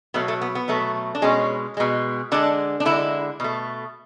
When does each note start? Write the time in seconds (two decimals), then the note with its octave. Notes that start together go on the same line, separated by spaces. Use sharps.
0.14 B2 F#3 A3 B3
0.28 A3
0.41 B3
0.55 B3
0.68 B2 F#3 A3
1.15 D4
1.22 B2 G#3 C#4
1.77 B2 G#3
2.32 D3 G#3 D4
2.80 D4
2.85 D3 G#3 E4
3.40 B2 A3